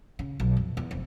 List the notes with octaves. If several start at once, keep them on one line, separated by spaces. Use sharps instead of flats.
C#3
B1
F2
E2
F1